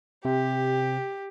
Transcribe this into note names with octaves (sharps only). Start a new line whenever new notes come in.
C3 G4